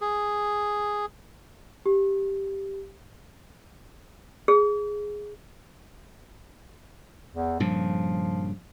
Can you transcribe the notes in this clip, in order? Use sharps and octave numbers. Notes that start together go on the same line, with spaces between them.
G#4
G4
G#4
E2
G2 A#2 C#3 F3